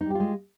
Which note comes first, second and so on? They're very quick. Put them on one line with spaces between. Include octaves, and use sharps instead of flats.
D#4 G3 G4 F4 G#3